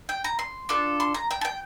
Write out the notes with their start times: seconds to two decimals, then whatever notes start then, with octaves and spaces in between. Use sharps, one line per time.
0.09 G5
0.24 A#5
0.39 C6
0.69 D4 F4 A4
1.00 C6
1.14 A#5
1.31 G5
1.41 A5
1.45 G5